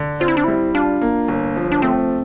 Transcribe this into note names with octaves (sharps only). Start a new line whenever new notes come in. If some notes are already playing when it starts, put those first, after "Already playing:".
Already playing: D3
C4 F4
E4
D4
G3 E4
D4 F4
A#3
G1
F3
D4
A3 C4